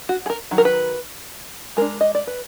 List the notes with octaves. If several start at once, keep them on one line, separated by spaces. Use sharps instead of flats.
F#4
G#4
A#4
D#3 F#3
A#4
B4
G#3 D4 A#4
D#5
D5
B4